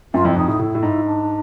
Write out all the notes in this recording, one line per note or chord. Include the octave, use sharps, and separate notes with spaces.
F#2 F4
F2 E4
F2 D#4
A2 D#4
A2 E4
A2
G#2
D4